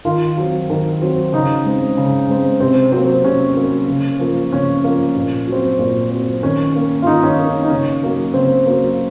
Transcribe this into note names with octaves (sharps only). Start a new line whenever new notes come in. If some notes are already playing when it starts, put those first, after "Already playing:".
D#3 F4
F#3 C4
D#3
F#3 C4
C#3 D#4
G#3 C4
C#3
G#3 C4
C3 C4
F#3 A#3 C4
C3 C#4
F#3 A#3
C#3
F3 A#3
C#3 C#4
F3 A#3
A#2
F#3 C4
A#2
F#3 C4
D#3 C#4
A#3
F4
D#3 D#4
C#4
D#4
A#3
C#4
D#4
C#3 C#4
F#3 A#3
C#3 C4
F#3 A#3